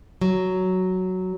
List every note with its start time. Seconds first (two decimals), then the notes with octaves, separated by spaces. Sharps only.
0.21 F#3